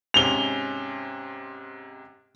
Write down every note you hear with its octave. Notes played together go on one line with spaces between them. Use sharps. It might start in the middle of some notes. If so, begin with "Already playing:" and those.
G#2 C3 C#4 F7 G7